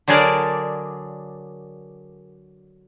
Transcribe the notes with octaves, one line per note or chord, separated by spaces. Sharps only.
D3 F#3 D4 G#4 A#4 D5